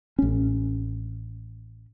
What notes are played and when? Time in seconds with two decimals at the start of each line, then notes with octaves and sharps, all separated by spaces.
0.19 A1 C#4